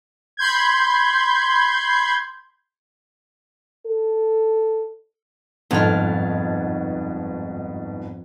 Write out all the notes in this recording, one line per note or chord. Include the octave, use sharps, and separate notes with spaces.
B5 C6 G6 G#6
A4
G1 F2 G#2 B2 F4